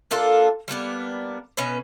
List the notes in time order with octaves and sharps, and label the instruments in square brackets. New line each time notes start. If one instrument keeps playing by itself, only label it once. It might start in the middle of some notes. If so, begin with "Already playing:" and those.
[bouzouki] A#3 D4 F4 A4
G3 A#3 B3 D4
B2 B3 C#4 B4